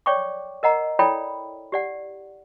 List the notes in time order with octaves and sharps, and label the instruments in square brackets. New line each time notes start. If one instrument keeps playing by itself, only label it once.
[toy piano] C#5 D5 G5 C#6 D6
A#4 D#5 F#5 A#5
E4 A4 C#5 D5 G5 B5
G4 D5 F#5